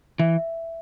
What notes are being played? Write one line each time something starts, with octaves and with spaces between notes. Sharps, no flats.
E3 E5